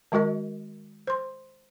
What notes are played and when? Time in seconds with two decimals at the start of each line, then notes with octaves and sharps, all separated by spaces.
0.12 D#3 G#3 F#4 A#4 D#5
1.07 C5 C6